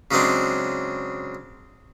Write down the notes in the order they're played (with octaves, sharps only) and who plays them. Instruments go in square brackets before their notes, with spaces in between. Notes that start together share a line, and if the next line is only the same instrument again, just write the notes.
[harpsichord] C#3 F#3 G#3 C4 D4